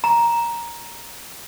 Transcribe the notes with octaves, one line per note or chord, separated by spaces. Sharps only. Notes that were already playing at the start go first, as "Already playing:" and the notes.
A#5